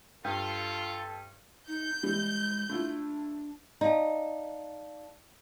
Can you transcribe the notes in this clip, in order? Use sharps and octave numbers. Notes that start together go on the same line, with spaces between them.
G2 F4 A4
D#4 G6
E3 G3 G#3
A3 D4 E4 F4
D#4 D5 F5 A5